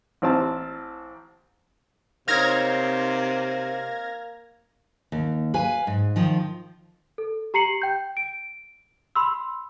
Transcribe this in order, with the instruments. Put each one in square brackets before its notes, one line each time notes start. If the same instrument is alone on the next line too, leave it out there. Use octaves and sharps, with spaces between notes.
[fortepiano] A1 C4 A5
[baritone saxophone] C3 [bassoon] A#3 [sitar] C4 D#4 C#5 [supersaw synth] F6 G#6 A#6
[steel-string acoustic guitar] D#2
B4 F5 G#5
G#2
D#3 F3 F4
[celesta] A4
G4 A#5 C7 C#7 F#7
G5 G6
D7
B5 C6 E6